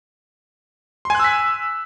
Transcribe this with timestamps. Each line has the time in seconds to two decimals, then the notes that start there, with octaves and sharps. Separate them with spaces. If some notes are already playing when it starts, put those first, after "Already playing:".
1.05 C6
1.10 G#5
1.15 F#6
1.20 E6
1.24 B6